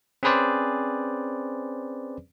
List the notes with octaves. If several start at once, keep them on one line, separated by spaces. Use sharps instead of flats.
C4 C#4 G#4 B4 C5 D5